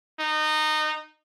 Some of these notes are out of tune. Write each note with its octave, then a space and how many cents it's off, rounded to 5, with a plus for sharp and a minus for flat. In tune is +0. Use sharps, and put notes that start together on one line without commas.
D#4 -20